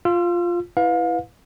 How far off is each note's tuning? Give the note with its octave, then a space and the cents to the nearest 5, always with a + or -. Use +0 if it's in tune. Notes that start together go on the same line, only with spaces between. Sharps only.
F4 +0 E6 +45
E4 +0 B4 +0 F5 +30